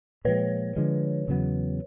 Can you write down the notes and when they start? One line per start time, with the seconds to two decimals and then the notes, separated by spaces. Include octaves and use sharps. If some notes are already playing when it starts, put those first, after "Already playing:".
0.25 A#2 F3 G#3 B4 C#5
0.76 D3 F3 G#3
1.28 E2 C#3 F#3 B3